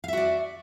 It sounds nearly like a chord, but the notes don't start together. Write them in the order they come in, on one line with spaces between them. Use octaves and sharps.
F5 E5 F#4 D5